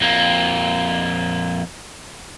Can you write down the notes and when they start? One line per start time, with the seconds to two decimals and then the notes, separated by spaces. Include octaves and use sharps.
0.01 F2 A#3